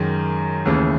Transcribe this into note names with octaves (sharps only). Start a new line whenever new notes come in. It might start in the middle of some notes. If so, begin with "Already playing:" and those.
Already playing: F#2 D#3 G#3
D#2 C#3 E3 A3